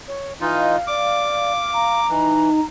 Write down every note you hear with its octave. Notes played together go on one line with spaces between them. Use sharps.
C#5
E3 D#4 F4 D#5 F5
D5 D6
A#5
E3 D#4